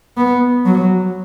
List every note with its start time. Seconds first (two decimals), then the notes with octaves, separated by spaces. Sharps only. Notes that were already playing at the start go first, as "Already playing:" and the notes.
0.17 B3
0.65 F#3